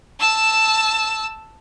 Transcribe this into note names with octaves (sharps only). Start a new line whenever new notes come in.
A5 E6